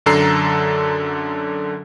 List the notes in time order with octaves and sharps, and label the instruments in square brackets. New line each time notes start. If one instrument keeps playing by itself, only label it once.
[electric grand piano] F#2 D3 A4 A#5 C7